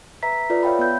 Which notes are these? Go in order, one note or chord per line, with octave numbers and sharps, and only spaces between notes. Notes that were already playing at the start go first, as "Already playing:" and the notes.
B4 E5 A#5 B6
F4 A4 B4 D5
C#5 E5 F5 G5 A5 B5
B3 G6